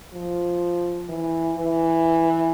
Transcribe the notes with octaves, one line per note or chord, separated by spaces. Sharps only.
F3
E3
E3